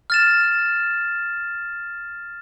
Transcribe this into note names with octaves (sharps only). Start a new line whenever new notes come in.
F6 A6 E7